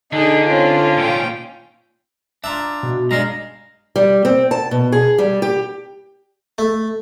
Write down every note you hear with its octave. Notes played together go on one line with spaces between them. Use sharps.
D3 D4 D#4 G#4
C4 C#4 F4
A#2 C#4 G5
D4 F4 E5 A#5
B2
G2 G#3 D4 F5 A#5
G3
C4
A5
B2
G#4
G3
G4
A3